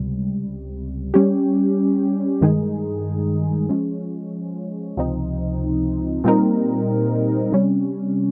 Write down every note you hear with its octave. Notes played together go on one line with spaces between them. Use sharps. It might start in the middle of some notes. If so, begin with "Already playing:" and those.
Already playing: C#2 C3 G3
G3 C#4 G4
G2 D#3 G#3 D#4 G#4
F3 G#3 C#4
C#2 C3 F3 C4 D#4
A#2 G3 C4 D#4 A#4
C3 G3 C#4